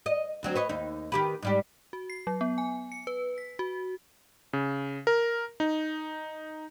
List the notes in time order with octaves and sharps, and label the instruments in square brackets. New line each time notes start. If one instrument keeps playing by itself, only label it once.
[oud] D#5
D2 F#3 C4
B4 C#5 D#5
D#2 D#4
D#3 G4 B4
G#2 G3 G4
[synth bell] F#4
C7
F#3
B3
G#5
C#7
B4
B6
F#4
[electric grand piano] C#3
A#4
D#4